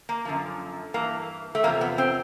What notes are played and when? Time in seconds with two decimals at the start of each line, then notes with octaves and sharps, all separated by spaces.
0.09 A#3
0.25 F#2 D3 F3
0.94 G2 E3 A#3
1.55 A3
1.63 E2 C3 F3 A#3
1.81 B3
1.98 C4